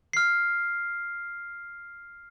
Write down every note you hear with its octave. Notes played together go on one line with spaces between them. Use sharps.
F6 C7